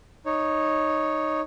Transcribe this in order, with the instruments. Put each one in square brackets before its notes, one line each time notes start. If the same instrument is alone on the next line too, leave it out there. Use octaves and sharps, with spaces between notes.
[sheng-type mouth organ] D#4 C#5